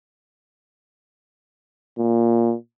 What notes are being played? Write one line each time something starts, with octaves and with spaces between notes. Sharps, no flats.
A#2